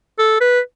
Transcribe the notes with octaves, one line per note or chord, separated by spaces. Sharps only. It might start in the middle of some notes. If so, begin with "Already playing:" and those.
A4
B4